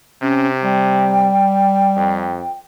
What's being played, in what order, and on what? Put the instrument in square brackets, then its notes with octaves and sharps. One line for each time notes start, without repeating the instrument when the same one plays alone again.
[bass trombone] C3 [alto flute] C#4
[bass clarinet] G3 [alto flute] G5
[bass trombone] F2